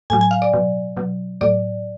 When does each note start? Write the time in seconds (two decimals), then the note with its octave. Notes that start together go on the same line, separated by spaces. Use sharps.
0.10 A2 F#3 G#5
0.21 G#5
0.31 F5
0.42 D5
0.53 B2 F#3
0.97 B2 F#3
1.41 A2 F#3 D5